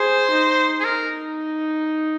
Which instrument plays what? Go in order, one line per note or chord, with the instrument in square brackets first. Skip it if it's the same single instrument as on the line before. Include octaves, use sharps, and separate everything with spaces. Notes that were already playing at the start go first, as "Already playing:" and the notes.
Already playing: [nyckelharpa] G#4 [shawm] C5
[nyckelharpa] D#4
[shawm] G#4
[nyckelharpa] D#4 [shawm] A#4